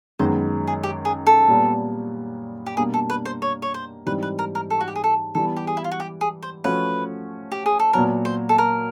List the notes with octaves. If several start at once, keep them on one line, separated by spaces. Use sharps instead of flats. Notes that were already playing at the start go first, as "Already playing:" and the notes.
F#2 D#3 G#3 B3 C5
G#4
G4
G#4
A4
A#2 G3 B3
G4
B2 G3 A#3 D4 G#4
A4
B4
C5
C#5
C#5
C5
G#2 E3 G3 C4 D#4 B4
B4
A#4
A#4
A4
F#4
G4
G#4
A4
E3 G3 B3 A4
G4
G#4
E4
F4
F#4
G4
G#4
C5
F3 A3 C#4 F#4 B4
G4
G#4
A4
A#2 F#3 B3 A#4
C5
A4
A#4